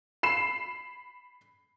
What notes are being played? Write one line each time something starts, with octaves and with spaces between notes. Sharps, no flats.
B5 C7 E7